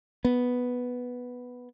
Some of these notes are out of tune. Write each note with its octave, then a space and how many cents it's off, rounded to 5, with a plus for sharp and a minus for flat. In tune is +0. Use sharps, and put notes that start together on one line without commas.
B3 +0